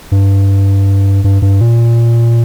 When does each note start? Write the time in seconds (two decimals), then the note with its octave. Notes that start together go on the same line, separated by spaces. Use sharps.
0.12 G2
1.24 G2
1.42 G2
1.61 A#2